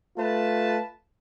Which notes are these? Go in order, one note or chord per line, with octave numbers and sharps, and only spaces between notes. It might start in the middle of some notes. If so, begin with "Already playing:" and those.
A3 F4 B4 A5